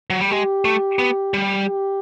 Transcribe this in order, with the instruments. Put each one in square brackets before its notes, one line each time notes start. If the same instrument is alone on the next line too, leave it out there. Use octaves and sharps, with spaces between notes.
[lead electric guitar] F#3
G3
[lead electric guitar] G#3 [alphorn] G4
[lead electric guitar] A3
B3
G3
[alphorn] G4